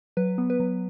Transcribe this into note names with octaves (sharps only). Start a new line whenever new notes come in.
F#3 B4
B3
B4
F#3